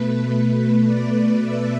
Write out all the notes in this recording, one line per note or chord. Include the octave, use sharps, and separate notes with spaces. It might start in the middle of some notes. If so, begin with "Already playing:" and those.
Already playing: B2 A3 B4
D5
E5